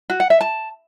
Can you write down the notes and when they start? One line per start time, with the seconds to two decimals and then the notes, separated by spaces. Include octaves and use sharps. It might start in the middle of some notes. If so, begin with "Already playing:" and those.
0.10 F#4
0.20 F#5
0.30 E5
0.41 A5